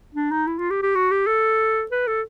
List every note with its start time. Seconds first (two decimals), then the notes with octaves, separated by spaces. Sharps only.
0.14 D4
0.31 D#4
0.47 E4
0.59 F4
0.70 G4
0.82 G4
0.95 F#4
1.11 G4
1.27 A4
1.91 B4
2.07 A4